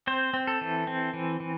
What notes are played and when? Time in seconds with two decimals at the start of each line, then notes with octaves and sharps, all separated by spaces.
0.07 C4 C5
0.34 C4
0.47 A4
0.61 E3
0.87 C4
1.14 E3
1.40 E3